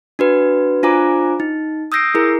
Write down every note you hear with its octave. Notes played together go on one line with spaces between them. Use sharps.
D4 F#4 B4
D4 F4 C5 G#5 A#5 D6
D#4
D#6 E6 G6 A#6 C7 D7
E4 G#4 A#4